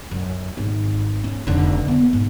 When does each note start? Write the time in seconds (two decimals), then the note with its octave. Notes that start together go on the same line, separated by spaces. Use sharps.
0.11 F#2
0.57 G#1
1.24 C#4
1.47 F1 D3
1.88 B3
2.13 G#2